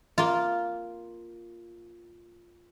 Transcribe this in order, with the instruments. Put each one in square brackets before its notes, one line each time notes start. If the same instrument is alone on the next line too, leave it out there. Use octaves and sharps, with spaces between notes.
[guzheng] A#3 F4